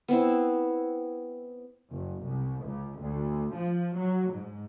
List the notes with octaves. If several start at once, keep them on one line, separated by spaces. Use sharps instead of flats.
B3 C4 E4
F#1
C2
C#2
D2
F3
F#3
G#2